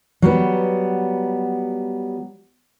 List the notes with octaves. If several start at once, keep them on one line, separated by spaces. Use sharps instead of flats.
F#3 G3 B3